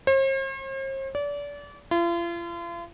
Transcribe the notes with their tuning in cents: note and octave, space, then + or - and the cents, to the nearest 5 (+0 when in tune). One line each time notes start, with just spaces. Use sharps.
C5 +45
D5 -30
F4 -40